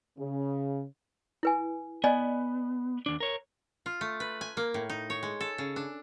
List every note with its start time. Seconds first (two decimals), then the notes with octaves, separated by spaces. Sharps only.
0.18 C#3
1.43 E4 B4 G#5
2.04 B3 D5 D#5 G#5
3.06 D#2 D4
3.20 A#4 C#5
3.86 F4
4.01 A3
4.20 B4
4.41 G#5
4.57 A#3
4.74 A2
4.89 D#4
5.10 C#5
5.23 G#3
5.40 A4
5.58 C#3
5.76 D4